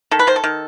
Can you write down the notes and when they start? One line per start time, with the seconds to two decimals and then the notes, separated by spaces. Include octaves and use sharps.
0.11 D#3 A4
0.19 B4
0.27 D#3 C5
0.36 A4
0.44 D#3